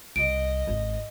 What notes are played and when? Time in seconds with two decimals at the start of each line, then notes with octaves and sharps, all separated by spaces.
0.16 C2 D#5 D7
0.67 G#1